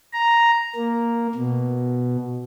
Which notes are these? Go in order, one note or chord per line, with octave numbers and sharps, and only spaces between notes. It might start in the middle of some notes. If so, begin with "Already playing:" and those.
A#5
A#3
B2